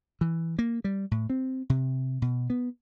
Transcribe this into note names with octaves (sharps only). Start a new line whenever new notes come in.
E3
A#3
G3
A2
C4
C3
B2
B3